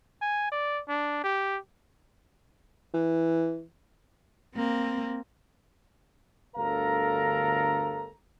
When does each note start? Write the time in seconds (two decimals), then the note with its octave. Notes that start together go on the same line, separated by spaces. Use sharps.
0.21 G#5
0.52 D5
0.88 D4
1.24 G4
2.94 E3
4.55 A#3 C4
6.56 G1 D2 A4 A#4 F5 A#5